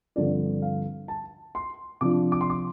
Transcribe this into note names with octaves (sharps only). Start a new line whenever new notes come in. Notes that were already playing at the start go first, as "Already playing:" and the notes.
G2 D3 F3 C4 F4 D5
F5
A5
C6
C3 F3 D4 F4 D6
D6
C6
D6